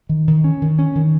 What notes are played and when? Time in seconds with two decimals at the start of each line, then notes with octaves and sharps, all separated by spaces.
0.09 D#3
0.28 D#3
0.44 C#4
0.62 D#3
0.79 C#4
0.95 D#3